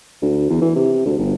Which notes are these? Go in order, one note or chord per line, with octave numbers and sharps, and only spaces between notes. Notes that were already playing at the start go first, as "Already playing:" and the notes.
D2
E2
E3
C3
D2
G1